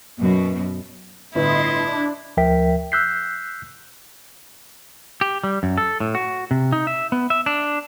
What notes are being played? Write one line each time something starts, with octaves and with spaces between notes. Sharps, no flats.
F#2 B2
G1 A2 E4 B4 D#5 C6
D4
D2 F3 A#4 E5 G5 B6
E6 F#6 G6 B6 C7
G4
G3
F#2
A4
A2
F#4
C3
D#4
E5
B3
E5
D4